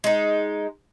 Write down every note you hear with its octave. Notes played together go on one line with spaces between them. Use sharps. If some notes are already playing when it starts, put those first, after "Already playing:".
G#3 D#4